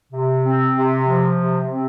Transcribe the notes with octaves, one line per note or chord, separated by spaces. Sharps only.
C3
C4
C3
F3
C3
C4